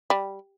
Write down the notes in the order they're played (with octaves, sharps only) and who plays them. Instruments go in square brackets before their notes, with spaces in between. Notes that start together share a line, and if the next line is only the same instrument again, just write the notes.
[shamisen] G3